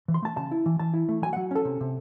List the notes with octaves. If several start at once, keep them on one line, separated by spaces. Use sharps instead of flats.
E3
C6
A3 A5
C#3 A5
E4
E3
E3 A5
E4
A3
F#3 G#5
F#5
F#3
C#4 A4
C3
C3